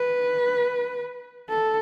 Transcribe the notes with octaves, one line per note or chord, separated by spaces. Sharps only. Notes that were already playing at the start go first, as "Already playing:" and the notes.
Already playing: B4
A4